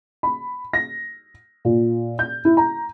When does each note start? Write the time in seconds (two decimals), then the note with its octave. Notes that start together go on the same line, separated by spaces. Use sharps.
0.23 B5
0.73 A#6
1.65 A#2
2.19 G6
2.45 E4
2.57 A#5